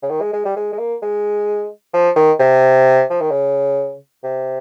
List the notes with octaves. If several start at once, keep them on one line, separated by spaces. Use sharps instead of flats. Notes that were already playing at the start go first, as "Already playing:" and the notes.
C#3
D#3
G#3
G#3
G3
G#3
G#3
A#3
G#3
F3
D#3
C3
F3
D#3
C#3
C3